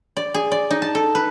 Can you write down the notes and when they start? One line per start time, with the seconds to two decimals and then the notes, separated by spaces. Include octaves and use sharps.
0.17 D5
0.34 G#4
0.52 D5
0.71 D#4
0.82 A5
0.95 A4
1.15 B4